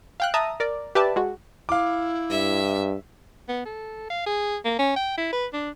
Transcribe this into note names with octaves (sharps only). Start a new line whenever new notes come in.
F5 G5 F#6
E5 A5 A#5 D#6
A#4 D5
G4 B4 D5 E5 A5
G#3 F#4
E4 F5 D6
G2 E5
B3
A4
F5
G#4
A#3
C#4
G5
E4
B4
D4